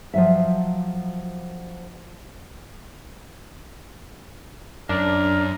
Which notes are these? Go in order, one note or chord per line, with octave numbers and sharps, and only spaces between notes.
F3 F#3 E5
F#2 D4 A#4